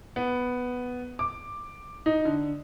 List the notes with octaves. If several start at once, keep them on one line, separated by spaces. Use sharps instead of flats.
B3
D6
D#4
D3